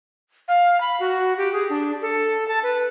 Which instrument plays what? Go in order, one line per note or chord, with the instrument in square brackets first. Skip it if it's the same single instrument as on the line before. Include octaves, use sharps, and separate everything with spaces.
[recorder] F5
B5
F#4
G4
G#4
D4
A4
A5
B4